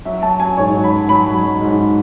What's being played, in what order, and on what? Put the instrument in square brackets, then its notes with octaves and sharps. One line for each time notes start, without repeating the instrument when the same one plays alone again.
[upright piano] F#3 E5
F#3 A5
F#3 G#5
G#2 C#5
F#3
B5
F#3
F#3 B5
F#3
F#3
G#2